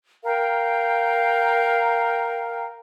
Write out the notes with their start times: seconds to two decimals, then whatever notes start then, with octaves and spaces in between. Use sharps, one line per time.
0.24 A#4 F5 G5